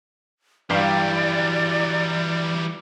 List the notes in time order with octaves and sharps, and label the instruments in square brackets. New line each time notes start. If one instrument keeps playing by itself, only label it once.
[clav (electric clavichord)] G2 G4 F5 [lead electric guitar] E3 [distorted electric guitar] F#3 G3 [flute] D5